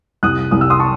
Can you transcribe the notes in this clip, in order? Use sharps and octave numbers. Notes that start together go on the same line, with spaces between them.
C2 D#6 F#6
C2 D#6
E6
C6 D#6
A5 C#6